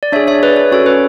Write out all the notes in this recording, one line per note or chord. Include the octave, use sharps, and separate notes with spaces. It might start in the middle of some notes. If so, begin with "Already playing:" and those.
D5
D4 G#4 C#5 E5
C#5 E5
B4 D5
C#5
C#4 F#4 A4 C#5
B4